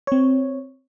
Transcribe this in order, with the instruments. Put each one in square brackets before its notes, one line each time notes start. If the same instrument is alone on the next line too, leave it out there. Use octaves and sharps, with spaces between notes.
[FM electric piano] C4 C#5